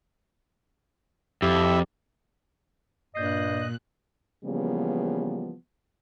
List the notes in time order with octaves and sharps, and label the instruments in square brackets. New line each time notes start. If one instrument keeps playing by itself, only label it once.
[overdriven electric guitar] F2 [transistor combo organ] E4 E5 [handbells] G4
[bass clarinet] G2 [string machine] A#2 F#6 [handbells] D5 G6 C7 [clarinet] D#5
[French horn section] C#3 E3 F3 G3 A#3 B3